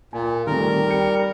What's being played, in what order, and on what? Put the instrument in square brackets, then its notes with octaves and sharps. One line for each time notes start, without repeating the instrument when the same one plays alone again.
[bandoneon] A#2 [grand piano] G#5
[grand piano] D#3 A3 C4 [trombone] G3 [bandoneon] A#4
[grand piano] G5 C#7